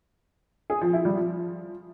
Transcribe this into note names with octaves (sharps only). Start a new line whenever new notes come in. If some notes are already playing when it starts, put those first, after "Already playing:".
G#4
F3
E4
G3
F3